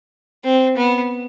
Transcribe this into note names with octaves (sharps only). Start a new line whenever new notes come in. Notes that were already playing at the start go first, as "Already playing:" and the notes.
C4
B3